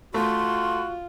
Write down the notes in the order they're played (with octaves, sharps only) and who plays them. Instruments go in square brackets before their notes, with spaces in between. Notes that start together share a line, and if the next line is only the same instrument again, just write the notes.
[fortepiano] A3 [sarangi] F4 [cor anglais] F#4 [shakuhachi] C6